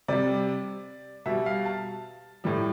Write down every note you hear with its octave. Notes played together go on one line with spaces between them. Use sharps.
C3 G3 D5
B2 G3 E5
F5
A5
A2 E3 G3